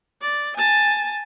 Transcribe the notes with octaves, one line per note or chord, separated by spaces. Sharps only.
D5
G#5 A5